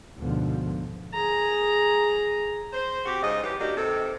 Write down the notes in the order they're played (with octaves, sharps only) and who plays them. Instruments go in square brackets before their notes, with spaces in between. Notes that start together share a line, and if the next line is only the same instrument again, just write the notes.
[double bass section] D2 G#2 B2 D3 F3
[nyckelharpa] G#4 A#5
[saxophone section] C5
C4 F#4 G4
G#2 C#3 D#5
E3 F#3 G4
A#3 D4 D#4 F#4 G4
C3 D#3 A4